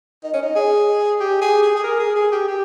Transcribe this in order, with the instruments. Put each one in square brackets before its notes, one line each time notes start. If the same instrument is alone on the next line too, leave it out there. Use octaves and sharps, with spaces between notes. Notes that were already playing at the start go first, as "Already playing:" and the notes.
[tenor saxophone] D#4
C#4
D#4
G#4
G4
G#4
G#4
G#4
A#4
G#4
G#4
G4
G4